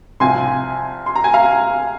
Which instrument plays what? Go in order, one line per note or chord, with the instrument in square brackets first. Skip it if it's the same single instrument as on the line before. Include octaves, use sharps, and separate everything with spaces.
[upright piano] C2 C3 F3 G#5 C6
C6
A#5
G#5
F5 A#5